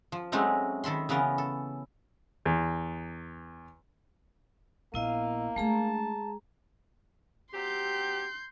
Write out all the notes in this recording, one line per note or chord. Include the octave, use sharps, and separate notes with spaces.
F3
F#3 G#3 A3 C4 C#4 D#4
D#3 A4 B5 C6
C#3 E3 B3 C#4 A#4
A4
E2
A#1 A#3 B3 E4 D#5 F5
G#3 A3 D4 G#4 A5 A#5
F#3 C4 G4 C6 G6